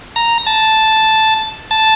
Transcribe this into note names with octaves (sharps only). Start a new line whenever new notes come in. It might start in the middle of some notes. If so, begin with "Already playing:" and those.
A#5
A5
A5